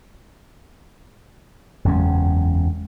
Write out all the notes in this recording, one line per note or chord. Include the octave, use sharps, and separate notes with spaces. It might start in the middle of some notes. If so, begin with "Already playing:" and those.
F#1 E2 G#3 C#4